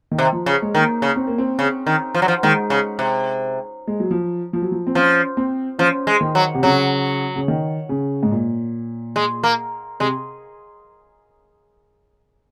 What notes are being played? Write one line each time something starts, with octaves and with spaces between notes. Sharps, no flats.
D#3
C3
F3
C#3
G#3
D#3 A#3
C#3
C4
A#3
C4
C#3
D#3
F3
F#3
F3
D#3 G#3
C#3
C3
G#3
F#3
F3
F3
F#3
F3
C4
F3 C#4
C4
F3 C#4
G#3
D#3
F#3
C3
C#3 F#3
C#3
D#3
C#3
G#2
A#2
G#3
A#3
C3 G#3